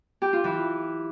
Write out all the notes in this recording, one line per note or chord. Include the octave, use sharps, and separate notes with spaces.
G4
F4
E3